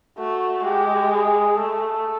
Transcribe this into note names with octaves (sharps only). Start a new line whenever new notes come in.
A3 F#4
G#3 G4
G#4
A3 A4